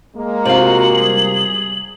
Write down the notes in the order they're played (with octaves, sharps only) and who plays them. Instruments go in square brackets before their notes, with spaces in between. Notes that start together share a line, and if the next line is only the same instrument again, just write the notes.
[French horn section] G#3 A#3
[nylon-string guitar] C3 F5 [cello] F4 F#4 [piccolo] F#7
[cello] G3 G#4